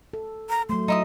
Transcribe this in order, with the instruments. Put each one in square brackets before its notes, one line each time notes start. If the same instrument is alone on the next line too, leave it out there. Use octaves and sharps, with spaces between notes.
[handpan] A4
[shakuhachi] A#5
[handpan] F#3 A3 [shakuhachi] C6
[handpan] F#3 [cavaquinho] D#4 E4 D#6